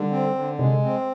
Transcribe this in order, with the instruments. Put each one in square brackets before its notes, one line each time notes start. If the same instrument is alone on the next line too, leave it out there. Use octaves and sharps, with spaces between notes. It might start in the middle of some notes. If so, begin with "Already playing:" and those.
Already playing: [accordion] D3 [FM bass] G3
[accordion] C4
D3
[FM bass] C3 [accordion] G#3
[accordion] C4